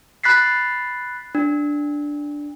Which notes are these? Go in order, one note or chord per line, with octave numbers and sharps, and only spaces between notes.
B5 F#6 A6 B6 C7
D4